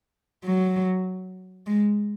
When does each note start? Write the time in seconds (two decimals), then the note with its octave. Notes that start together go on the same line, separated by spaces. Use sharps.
0.45 F#3
1.67 G#3